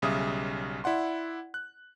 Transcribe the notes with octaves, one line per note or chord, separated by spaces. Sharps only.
B1 C#3 G3 E5 D#6
E4 D5 F#5 C6
F#6